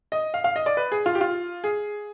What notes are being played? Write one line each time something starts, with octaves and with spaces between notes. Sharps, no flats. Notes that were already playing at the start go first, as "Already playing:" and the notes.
D#5
F5
F5
D#5
D5
B4
G#4
F4
G4
F4
G#4